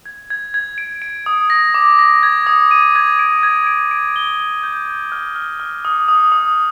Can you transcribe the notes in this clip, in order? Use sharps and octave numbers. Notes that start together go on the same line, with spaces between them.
G#6
G#6
G#6
D7
D7
D#6
A#6
D6
A#6
G#6
D#6
D#7
G#6
D7
G#6
D7
D7
G7
G7
G6
G6
F6
F6
F6
D#6
D#6
D#6